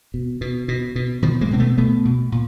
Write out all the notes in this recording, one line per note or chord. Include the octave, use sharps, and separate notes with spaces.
B2
B2
B2
B2
B2 D#3 F3
G#3 A#3
B2 C4
A3 B3
B2 A3 B3
B2
A#2